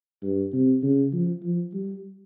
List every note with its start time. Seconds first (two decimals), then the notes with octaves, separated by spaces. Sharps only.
0.23 G2
0.53 C3
0.83 C#3
1.13 F3
1.43 F3
1.73 G3